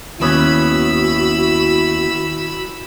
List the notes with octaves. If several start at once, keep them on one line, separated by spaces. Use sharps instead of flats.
D#2 B3 C#4 E4 F#4 B5 E6